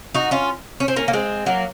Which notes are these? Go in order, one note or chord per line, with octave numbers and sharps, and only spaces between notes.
D#4 F#4
C#4 F4
C#4
C4
A#3 C#4
A#3
G#3 C4
F#3 A#3